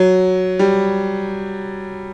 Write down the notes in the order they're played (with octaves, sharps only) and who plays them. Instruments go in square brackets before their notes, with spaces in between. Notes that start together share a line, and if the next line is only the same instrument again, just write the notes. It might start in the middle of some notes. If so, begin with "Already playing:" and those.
Already playing: [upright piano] F#3
G3